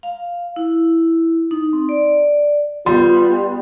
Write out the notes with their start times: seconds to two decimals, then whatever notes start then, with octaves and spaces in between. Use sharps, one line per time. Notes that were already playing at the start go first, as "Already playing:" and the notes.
0.03 F5
0.56 E4
1.51 D#4
1.73 C4
1.89 D5
2.86 G3 B3 F4 C6